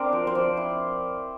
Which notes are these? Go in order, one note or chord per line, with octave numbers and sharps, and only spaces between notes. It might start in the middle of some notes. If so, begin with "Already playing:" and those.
Already playing: C4 D4 A#4 C5 D5
F3
C5
F3 D5
E4